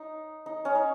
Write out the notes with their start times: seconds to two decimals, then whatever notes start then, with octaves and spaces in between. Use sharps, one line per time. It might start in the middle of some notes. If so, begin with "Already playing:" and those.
Already playing: D#4
0.46 D#4
0.65 C#4
0.75 D#4